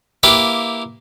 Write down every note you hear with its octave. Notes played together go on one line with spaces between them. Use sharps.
A#3 E4 G4 B4 F5 G5